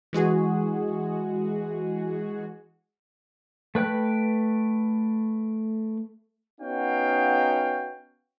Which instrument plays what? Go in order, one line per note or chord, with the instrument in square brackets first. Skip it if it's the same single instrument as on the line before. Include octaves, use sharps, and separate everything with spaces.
[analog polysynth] E3 G#3 F#4 G#4
[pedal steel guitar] A3 B4 G5 F#6
[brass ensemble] B3 C#4 D#4 F#4 F5 G5